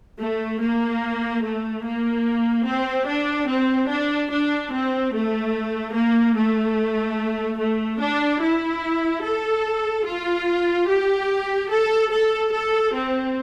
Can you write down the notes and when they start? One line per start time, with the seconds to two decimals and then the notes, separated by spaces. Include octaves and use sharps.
0.19 A3
0.62 A#3
1.43 A3
1.84 A#3
2.66 C4
3.07 D4
3.49 C4
3.89 D4
4.31 D4
4.72 C4
5.13 A3
5.95 A#3
6.36 A3
7.59 A3
8.00 D4
8.42 E4
9.24 A4
10.05 F4
10.88 G4
11.71 A4
12.12 A4
12.52 A4
12.94 C4